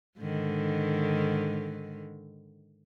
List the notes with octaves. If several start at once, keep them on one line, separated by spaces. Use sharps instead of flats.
G#2 D3 D#3